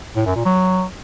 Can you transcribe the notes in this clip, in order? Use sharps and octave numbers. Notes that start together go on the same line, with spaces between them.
A2
F#2
A#2
F#3